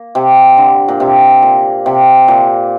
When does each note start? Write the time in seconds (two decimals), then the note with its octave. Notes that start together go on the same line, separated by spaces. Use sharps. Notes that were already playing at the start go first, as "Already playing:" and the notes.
Already playing: A#3
0.15 C3
0.57 D3
0.88 A#2
1.00 C3
1.42 A#2
1.86 C3
2.28 A#2